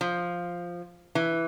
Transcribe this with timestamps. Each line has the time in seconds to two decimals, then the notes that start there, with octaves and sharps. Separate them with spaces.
0.01 F3
1.15 E3